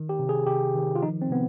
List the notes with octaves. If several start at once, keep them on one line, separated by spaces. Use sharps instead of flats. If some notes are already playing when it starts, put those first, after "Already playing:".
Already playing: D#3
G4
C3
G#4
C3 G4
D#3
F4
F3 D#4
C4
C3 B3